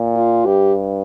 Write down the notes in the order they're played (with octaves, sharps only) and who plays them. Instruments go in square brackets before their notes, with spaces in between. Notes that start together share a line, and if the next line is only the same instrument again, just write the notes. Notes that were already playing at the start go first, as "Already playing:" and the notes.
Already playing: [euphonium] A#2
[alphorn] F4
[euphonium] G2 [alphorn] G4